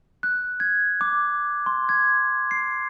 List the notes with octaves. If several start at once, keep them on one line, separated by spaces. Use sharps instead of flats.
F#6
G#6
D6
C6
G#6
C7